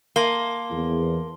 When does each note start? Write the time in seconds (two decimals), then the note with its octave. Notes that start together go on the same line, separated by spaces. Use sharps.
0.16 A#3 A5 C6 G7
0.70 E2